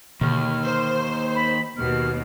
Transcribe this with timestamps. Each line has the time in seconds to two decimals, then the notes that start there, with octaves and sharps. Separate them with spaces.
0.21 D#2 B2 D3 F6
0.64 C5
1.35 B5
1.77 D#2 B2 F6